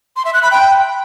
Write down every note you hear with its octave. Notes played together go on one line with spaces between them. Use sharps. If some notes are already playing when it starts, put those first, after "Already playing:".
C6
E5
F#6
B5
G5